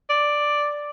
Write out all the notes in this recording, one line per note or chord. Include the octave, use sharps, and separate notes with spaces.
D5